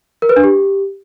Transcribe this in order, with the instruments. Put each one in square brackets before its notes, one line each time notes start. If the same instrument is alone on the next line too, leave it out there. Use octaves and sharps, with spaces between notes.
[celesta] A#4
B4
D4
G4